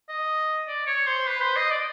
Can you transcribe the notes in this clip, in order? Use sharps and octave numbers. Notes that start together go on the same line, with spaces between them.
D#5
D5
C#5
C5
B4
C5
D#5
D5